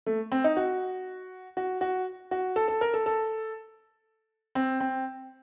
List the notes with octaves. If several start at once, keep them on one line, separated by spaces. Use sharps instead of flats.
A3
C4
D#4
F#4
F#4
F#4
F#4
A4
A4
A#4
A4
A4
C4
C4